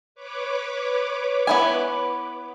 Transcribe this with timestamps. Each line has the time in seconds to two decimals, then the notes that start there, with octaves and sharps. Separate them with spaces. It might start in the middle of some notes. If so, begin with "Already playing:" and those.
0.15 B4 C#5 D6
1.47 B3 E4 G#5